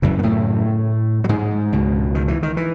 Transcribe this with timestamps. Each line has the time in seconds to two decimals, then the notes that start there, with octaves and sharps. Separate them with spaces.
0.02 F#2 C#3 E3
0.19 B3
0.23 A2 A3
1.24 F#3
1.29 G#2 G#3
1.73 C#2 B2
2.15 D#3
2.28 E3
2.43 D#3
2.57 E3